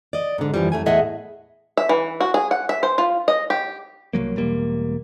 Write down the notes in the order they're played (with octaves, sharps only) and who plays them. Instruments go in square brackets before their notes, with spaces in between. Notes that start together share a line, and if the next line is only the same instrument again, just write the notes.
[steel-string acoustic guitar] D5 D#5
G#2 D3
F#2 E3 F3 G3
F#2 A3 G#5
E2 A2 G#4 D#5 E5 F#5
[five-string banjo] E5
E3
F#4
G#4
F#5
E5
C5
F4
D#5
G4
[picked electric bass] C2 F#3 A#3
E1 G3 A#3